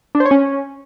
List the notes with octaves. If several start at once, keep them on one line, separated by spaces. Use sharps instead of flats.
D4
C5
C#5
C#4